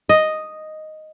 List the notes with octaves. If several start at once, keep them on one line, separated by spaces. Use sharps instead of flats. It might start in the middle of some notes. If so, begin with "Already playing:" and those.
D#5